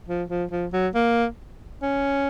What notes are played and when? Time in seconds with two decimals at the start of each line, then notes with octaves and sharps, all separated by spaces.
0.08 F3
0.29 F3
0.51 F3
0.73 F#3
0.95 A#3
1.82 C#4